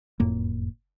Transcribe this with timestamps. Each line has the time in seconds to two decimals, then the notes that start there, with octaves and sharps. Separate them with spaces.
0.20 F#1 F2 A2 A#3